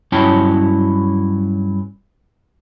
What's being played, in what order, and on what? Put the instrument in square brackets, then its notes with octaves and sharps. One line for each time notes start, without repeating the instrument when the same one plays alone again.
[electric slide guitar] G2 F#3 C#4 E4 G5 A5